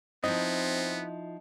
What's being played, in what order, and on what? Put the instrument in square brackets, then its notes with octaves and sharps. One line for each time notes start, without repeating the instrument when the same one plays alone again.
[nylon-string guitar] F3 D#4 E4 [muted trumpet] B3 [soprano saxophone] C4 [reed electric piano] D#5